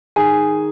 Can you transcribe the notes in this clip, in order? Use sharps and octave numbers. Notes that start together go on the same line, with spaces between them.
D#3 G#4 G#5